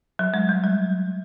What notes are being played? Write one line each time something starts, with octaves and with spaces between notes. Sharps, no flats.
F#3
G#3
G3
F#3